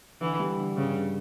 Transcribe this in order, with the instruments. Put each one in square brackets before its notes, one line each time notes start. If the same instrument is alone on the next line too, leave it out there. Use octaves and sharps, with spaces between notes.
[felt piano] D3 [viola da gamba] E3
[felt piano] G3
D3
[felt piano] G2 [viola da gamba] C#3
[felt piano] G2